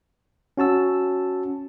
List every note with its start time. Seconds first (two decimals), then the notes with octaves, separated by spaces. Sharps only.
0.57 C#4 F#4 A5 E6